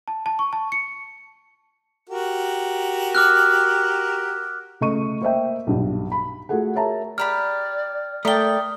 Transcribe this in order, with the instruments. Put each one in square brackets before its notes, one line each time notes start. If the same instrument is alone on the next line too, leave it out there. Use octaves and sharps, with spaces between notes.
[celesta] A5
A5
C#6
A5
C#7
[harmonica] F#4 G4 A#4
[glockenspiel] D6 F6 F#6
[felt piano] C#2 A3 D#5 C#6 D#7
A#3 C5 D#5 E5 G5
B1 G2 A#2
B5
A3 F4 F#4 G#4 A4 F#5
G#4 A#4 C#5 E5 A5 A#5
[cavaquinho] G4 A#5 B5 [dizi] D5 [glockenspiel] F6
[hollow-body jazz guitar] A3 [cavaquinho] A#4 G5 [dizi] D5 [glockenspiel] D#6 G7